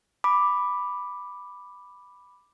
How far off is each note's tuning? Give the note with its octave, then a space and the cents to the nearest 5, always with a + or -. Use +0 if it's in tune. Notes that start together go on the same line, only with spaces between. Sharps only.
B5 +0 D6 +5